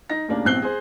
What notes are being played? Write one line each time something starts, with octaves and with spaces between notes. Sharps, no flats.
D#4 A#6
D#2 A2 C#3 A#3 D4
A1 B2 C4 F#6 C7 G7
G#4 C5